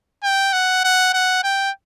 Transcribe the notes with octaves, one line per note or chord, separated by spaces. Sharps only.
G5
F#5
F#5
F#5
G5